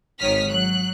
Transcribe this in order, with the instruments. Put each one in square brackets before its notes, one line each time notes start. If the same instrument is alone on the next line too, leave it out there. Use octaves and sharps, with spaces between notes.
[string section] G#1 D#3 C#5 D#6 F6 B6
F#3 F#6